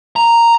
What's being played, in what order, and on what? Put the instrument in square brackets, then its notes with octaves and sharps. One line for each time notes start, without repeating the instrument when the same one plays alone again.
[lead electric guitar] A#5